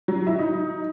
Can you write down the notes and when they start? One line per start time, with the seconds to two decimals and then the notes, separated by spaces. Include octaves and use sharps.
0.08 F#3
0.27 E4
0.39 D#4